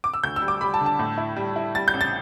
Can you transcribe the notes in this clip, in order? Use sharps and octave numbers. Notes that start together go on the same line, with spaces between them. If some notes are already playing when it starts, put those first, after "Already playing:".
D6
E6
D2 G6
E6
G3
D6
G3 B5
A5
D3
A5
A2
E4
G3
E4
G3 A6
G6
A1
A6